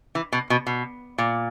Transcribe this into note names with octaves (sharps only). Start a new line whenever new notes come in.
E3
B2
B2
B2
A#2